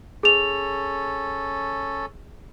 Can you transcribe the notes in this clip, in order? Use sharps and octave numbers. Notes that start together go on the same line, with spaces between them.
C#4 G#4 A4 F7